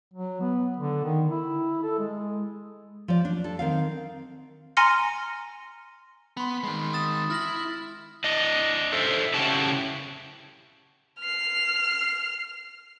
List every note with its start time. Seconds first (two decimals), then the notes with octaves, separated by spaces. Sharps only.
0.14 F#3
0.41 B3
0.77 D3
1.04 D#3
1.31 E4
1.83 A4
1.99 G#3
3.08 F3 D5
3.25 D4
3.44 A4
3.59 D#3 C4 F5
4.77 G#5 A#5 C6 F6 A#6 C#7
6.37 B3 B5 C6
6.64 D#3 G#3
6.93 D#6 A6 E7
7.30 E4 F6 A#6 F#7
8.24 D4 D#5
8.93 A4 C5 E5
9.34 C#3 E4 F#4 G4 A5
11.20 F6 C7